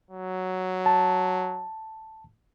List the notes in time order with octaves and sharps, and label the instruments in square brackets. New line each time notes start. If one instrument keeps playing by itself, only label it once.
[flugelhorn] F#3
[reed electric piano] A5